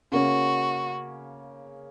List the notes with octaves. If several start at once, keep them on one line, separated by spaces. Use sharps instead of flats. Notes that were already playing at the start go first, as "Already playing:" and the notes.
C#3 A#3 C#4 F#4